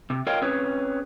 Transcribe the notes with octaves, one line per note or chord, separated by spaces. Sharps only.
C3
F4 A#4 C#5 D#5 F5 G5
C4 C#4 G#4 B4 C#5